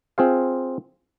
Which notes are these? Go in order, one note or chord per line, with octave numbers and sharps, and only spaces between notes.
C4 F4 G#4 C5 F5